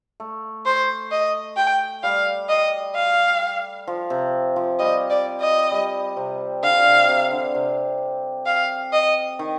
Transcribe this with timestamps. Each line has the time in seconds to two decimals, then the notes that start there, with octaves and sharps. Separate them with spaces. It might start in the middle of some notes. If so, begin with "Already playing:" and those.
0.20 A3
0.66 C5
1.11 D#5
1.57 G5
2.03 G3 F5
2.49 D#5
2.95 F5
3.87 F3
4.10 C3
4.56 F3
4.79 G3 D#5
5.10 D5
5.41 D#5
5.71 G3
6.17 C3
6.63 D3 F5
6.85 C3
7.09 C3
7.32 D3
7.55 C3
8.46 F5
8.92 D#5
9.39 D#3